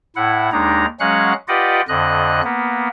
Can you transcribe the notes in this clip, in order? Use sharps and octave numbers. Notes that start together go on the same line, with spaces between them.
A2 E4 F#5
D#2 G#3 D4 D#4 A#5
F#3 G#3 C#4 F5 F#5 F#6
F4 G4 B4 D5 D#5 F#5
F2 D3 D#5 F#6
A#3 B3